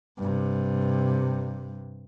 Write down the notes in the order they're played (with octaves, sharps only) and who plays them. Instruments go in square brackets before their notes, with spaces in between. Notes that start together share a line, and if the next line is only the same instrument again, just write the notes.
[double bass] G2 C3